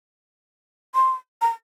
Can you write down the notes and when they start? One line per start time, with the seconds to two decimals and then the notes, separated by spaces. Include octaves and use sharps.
0.95 C6
1.42 A#5